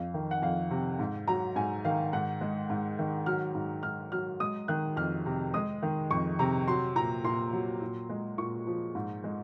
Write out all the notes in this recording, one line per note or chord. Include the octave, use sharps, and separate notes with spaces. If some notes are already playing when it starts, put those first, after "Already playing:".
Already playing: F2 F5
D#3
F#5
F2 F5
C3
G#2
F#3 A#5
G#2 G#5
D#3 F5
G#2 F#5
G#3
G#2
D#3
F#3 F6
G#2
G#2 F6
F#3 F6
G#3 D#6
D#3 F#6
F2 F6
C3
G#3 D#6
D#3
F2 C#6
C3 A#5
F#3 C6
A#2 A#5
A#2 C6
F#3
A#2
G#3
A#2 C#6
F3
G#2
G#3